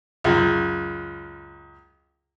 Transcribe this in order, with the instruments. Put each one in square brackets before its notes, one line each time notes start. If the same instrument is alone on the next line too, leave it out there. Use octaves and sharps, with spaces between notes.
[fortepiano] C#2 F#2